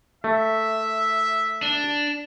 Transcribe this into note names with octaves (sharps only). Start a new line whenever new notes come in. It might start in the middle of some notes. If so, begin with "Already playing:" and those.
A3 E5
D4